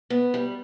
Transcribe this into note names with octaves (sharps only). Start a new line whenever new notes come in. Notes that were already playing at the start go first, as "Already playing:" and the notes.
B3
G3